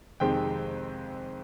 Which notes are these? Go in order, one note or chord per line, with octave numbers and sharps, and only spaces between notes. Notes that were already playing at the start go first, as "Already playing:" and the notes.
F2 C3 D#3 G#3 C4 G5